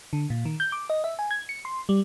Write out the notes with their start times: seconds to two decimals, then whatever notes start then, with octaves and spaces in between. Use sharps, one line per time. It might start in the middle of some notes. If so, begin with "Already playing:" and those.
0.13 D3
0.30 A#2
0.45 D#3
0.60 G6
0.72 D6
0.90 D#5
1.04 E5
1.19 G#5
1.31 G#6
1.49 C#7
1.65 C6
1.89 G3